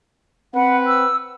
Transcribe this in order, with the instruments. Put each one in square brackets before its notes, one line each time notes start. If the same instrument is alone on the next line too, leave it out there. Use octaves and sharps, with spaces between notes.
[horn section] C4 B4 [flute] F#5
[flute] E6